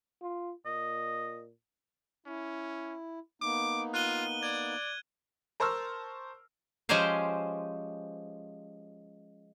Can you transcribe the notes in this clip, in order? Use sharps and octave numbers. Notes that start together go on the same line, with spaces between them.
F4
A#2 D#5
C#4 E4
A#3 B3 D#4 D6
F4 F#6 D#7 G7
D5 G#6
A#4 C5 A5 C#6 E6 F6
F3 G#3 C#4 G4 C5 F5